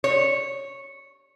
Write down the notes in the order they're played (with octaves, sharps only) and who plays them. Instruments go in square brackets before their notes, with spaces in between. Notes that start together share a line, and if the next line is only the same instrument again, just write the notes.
[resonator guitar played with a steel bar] C#5